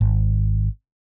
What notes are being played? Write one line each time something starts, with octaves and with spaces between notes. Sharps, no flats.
G#1